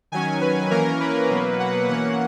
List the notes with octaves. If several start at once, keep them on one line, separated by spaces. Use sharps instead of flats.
D#3 F#3 C#4 G#5
B4
E3 A#3 C#4 A#4
B4
B2 F#3 A#3
F#5
E3 A#3 C#4 F#5